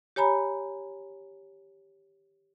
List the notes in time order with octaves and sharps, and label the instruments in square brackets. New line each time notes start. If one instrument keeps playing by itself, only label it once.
[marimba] G4 C#5 G#5 A#5 B5